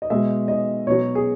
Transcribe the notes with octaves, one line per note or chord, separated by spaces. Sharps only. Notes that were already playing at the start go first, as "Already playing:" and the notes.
D#5
B2 G#3 E5
D#5
B2 F#3 C#5
G#4